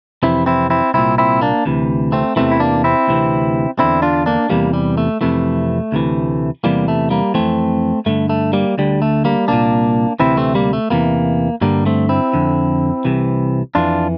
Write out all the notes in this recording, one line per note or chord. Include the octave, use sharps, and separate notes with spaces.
F2 C3 E3 C4 E4
C4 E4
C4 E4
C2 A#2 C4 E4
C4 E4
A#3 D4
D2 C3 E3
A3 C4
E2 C3 E3 A3 C4
E4
A#3 D4
C4 E4
D2 C3 E3
E2 D3 C4 E4
D4 F4
A#3 D4
E2 C3 E3 G3 A#3
G3
A3
F2 C3 E3 A3
D2 C3 E3
E2 C3 E3 G3 A#3
A3
G3 A#3
F2 E3 A3 C4
G2 D3 A3
A3
G3 A#3
D2 D3 G3
A3
G3 A#3
C2 A#2 A#3 D4
D2 C3 E3 C4 E4
A3 C4
G3 A#3
A3
E2 C3 E3 G3 A#3
G2 D3 G3 A#3
A3 C4
C4 E4
F2 D3
C2 C3 E3
F2 E3 D4 F4